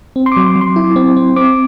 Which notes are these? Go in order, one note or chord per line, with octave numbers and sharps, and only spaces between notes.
C4
C6
D6
F#3
C6
F#3
C6
E4
C4
C4
C4 D6